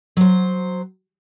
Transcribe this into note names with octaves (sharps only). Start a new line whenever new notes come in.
F#3 C5